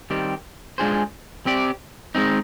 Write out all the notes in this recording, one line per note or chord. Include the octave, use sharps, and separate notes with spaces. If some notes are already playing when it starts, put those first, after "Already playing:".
D#3 G3 C4 G4
G#3 D4 F4 G#4 C5
C4 G4 D5
G#3 C4 D#4